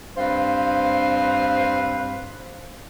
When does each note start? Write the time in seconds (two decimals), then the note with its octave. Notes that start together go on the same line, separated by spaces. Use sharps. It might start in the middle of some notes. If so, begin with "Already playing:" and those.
0.18 G2 C4 B4 C5 F5